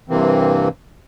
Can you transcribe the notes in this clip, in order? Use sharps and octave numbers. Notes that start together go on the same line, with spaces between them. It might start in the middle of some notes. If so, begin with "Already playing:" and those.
G2 C3 E3 A#3 C4